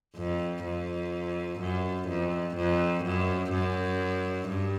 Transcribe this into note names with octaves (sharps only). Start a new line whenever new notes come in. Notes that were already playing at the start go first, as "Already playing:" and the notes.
F2
F2
F#2
F2
F2
F#2
F#2
G2